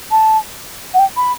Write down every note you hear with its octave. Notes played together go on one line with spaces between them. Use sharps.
A5
F#5
G5
B5